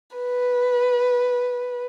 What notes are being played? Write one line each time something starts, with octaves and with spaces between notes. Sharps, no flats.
B4